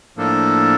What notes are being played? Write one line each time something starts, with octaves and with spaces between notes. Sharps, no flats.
A2 F3 A#3 D4 A4